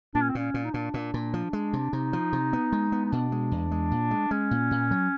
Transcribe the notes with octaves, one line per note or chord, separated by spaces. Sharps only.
A#2 D4
C#4
C4
A#2 C#4
A#2
D#4
A#2 D4
A#2
A#2
F3
G#3
C3
C3 D#4
F3
C3
B3
G#3
B3
D#4
B2 D4
G#3
E2
G#3
A#2
G#3
G#3 C#4
A#2
A#2
F#3